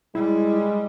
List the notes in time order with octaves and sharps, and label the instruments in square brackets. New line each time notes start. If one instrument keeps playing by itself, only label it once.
[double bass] G3 [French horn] G#3 [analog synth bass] E4